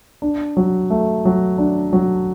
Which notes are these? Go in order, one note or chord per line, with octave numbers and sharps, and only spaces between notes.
D4
F#3
A3
F#3
D4
F#3